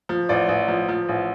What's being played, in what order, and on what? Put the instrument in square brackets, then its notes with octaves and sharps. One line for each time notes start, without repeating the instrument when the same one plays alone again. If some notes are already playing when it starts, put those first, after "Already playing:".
[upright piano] F3
A1 D5
A1
F3
F3
A1